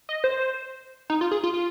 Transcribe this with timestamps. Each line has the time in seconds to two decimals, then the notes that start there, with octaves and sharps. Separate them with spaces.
0.09 D#5
0.24 C5
1.10 D#4
1.21 F4
1.31 G#4
1.43 F4
1.54 F4